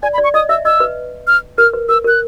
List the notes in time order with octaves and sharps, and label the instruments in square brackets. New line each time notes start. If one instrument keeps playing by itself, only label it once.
[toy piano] D5 [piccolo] G#5
[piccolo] B5
[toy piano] D5
[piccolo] C#6
[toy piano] D#5 [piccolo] D#6
[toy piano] E5 [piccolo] E6
[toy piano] D#5 [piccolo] E6
[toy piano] B4
[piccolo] F6
[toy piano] A#4 [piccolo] F6
[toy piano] B4
[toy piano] A#4 [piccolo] E6
[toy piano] A#4 [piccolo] F#6